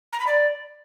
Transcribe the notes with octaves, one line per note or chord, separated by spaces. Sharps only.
A#5
B5
D5